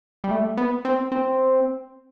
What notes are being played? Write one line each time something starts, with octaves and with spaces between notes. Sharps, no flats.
G3
A3
B3
C4
C4